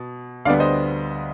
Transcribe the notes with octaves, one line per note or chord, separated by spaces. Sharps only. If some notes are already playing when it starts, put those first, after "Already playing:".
Already playing: B2
D2 D3 G3 B3 D5 F5
C5 D#5